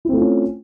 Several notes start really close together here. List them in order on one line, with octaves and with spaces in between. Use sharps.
E4 C4 A3 F4 C#4